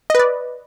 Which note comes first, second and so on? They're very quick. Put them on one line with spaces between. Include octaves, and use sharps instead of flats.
D#5 B4 D5